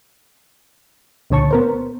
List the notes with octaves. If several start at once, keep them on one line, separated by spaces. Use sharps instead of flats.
C#2 A#2 D3 C#5 A5 C#6
B3 A#4 C5